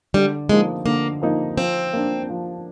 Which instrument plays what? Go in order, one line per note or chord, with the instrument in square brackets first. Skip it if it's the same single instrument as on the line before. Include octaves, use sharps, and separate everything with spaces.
[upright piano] D3 [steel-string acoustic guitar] G3
[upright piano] F3 A#3 D#4 [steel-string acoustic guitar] G#3
[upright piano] D3 [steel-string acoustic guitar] A#3
[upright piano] F3 A#3 D#4
[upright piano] F3 [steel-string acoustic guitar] C4
[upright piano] A#3 D4
F3